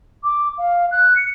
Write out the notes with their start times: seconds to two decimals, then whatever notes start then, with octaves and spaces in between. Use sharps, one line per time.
0.23 D6
0.58 F5
0.91 F#6
1.16 C#7